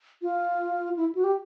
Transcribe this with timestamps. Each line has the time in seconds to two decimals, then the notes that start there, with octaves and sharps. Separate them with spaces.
0.22 F4
0.97 E4
1.15 F#4
1.24 G4